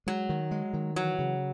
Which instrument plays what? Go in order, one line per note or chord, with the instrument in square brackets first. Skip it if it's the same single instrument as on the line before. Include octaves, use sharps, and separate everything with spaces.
[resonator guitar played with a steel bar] F#3 [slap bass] G#3
[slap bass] D#3
G#3
D#3
[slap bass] E3 [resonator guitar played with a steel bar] F#3
[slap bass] C#3